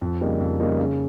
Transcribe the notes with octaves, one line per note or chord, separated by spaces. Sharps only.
F2
C#3 G3 A#3 D#4
F2
C#3 G3 A#3 D#4
C#3